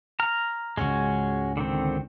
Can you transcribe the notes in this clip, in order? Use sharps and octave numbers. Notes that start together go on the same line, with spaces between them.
A#5 F6
C#2 G#2 G#3 C#4 F#4
D3 D#3 C4